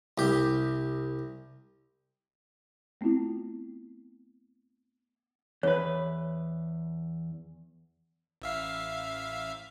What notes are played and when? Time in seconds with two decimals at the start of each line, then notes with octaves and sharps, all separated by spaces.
0.18 C2 G4
3.01 A3 B3 C4 E4 F4
5.63 E2 B4 C#5
8.42 A1 E5 F5